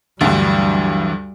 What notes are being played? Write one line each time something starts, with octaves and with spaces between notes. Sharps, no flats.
D2 G2 E3 F#3 G3